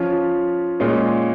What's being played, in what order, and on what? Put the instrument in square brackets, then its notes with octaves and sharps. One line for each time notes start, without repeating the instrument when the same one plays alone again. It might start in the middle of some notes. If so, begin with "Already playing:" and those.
Already playing: [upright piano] F3 C#4 F4
A#2 G#3 C#4 F4